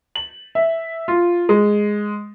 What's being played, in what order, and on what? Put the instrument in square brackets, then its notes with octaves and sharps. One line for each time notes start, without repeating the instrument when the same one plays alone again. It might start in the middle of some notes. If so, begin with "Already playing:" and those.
[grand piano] F#7
E5
F4
G#3